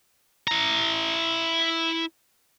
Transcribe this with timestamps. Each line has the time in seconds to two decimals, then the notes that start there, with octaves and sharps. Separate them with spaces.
0.48 E4 A#5